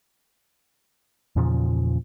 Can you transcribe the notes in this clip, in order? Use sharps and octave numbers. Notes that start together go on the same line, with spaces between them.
E2 A#2 C#3 F3